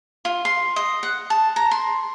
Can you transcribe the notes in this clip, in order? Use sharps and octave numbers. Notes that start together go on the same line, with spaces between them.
F4
C6
D#5
F#5
A5
A#5
C6